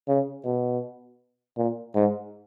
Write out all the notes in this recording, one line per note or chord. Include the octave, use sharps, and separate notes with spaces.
C#3
B2
A#2
G#2